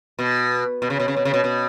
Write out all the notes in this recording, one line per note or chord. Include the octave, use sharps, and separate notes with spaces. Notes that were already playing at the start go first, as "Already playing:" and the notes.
B2
B2
C#3
B2
C#3
B2
C#3
B2
B2